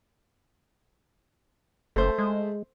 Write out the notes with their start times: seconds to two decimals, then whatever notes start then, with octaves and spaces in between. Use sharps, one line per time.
1.96 F#1 A3 C5
2.18 G#3